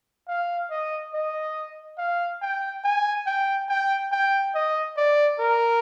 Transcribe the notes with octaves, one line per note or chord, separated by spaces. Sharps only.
F5
D#5
D#5
F5
G5
G#5
G5
G5
G5
D#5
D5
A#4